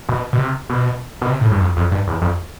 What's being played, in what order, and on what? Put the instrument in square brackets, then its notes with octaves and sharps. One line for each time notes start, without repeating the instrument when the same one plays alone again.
[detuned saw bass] B2
B2
C3
B2
B2
C3
A2
G2
F2
F2
G2
E2
F2